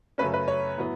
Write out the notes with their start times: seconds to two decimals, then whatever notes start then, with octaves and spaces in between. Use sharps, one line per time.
0.18 F#2 C#3 A3 C#4 B4
0.34 B4
0.48 C#5
0.78 A2 F#3 B3 E4